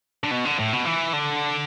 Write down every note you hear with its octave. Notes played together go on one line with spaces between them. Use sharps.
D3
B2
D3
A2
B2
E3
D3